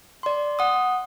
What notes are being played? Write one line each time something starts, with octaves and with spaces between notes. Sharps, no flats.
D5 C6
F#5 D#6